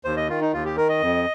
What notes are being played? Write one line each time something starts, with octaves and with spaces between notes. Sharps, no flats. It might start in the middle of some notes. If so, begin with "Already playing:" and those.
D#2 C5
D#5
D#3 F4
D#4
D#2 F4
G4
D#3 A#4
D#5
F2